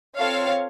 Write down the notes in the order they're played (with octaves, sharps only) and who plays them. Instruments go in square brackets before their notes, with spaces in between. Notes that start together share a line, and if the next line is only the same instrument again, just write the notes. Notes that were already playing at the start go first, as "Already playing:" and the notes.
[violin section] C4 F4 A4 C#5 F5